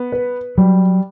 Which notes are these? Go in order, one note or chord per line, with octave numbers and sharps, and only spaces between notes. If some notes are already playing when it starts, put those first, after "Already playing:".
Already playing: B3
B4
F#3 G3